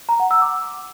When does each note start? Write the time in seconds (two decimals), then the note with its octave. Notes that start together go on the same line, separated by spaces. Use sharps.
0.09 A#5
0.20 F#5
0.31 E6
0.42 D6